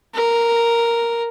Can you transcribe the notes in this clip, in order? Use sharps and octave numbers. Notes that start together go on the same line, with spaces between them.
A#4